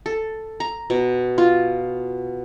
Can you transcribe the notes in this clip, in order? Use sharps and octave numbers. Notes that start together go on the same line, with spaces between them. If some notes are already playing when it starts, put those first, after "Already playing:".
A4
A#5
B2
F4